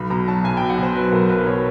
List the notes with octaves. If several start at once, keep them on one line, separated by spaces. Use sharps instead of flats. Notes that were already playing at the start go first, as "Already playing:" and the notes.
Already playing: B1 B5
B2 A#5
F#3 A5
B1 G#5
B1 G5
F#5
B2 C5
F#3 B4
B1 A#4
B1 B4
B2 C#5